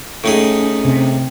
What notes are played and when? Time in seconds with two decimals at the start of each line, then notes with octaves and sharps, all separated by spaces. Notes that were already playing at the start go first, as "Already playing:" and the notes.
0.24 A2 C#4 D#4 G#4
0.85 C3